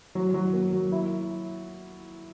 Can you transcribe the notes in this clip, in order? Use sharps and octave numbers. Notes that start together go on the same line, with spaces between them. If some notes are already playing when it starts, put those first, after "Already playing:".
F#3
F#3
A#3
F#3
E4